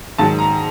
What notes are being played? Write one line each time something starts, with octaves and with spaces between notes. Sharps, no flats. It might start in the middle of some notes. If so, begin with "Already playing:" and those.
G#2 D#3 F#3 A5
A#5